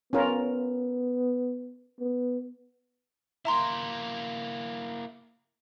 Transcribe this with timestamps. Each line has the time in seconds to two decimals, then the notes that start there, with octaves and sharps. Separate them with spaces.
0.13 B3 C#4 F4 A#4
2.00 B3
3.45 A#3 E4 E5 A#5 C6